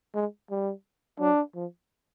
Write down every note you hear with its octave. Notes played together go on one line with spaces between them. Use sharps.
G#3
G3
F#3 D4
F3